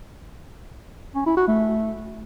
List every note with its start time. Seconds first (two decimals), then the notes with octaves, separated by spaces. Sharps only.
1.15 C#4
1.26 E4
1.37 F#4
1.48 A3